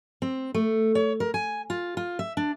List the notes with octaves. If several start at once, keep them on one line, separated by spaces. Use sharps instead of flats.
C4
A3
C#5
A#4
G#5
F4
F4
E5
D4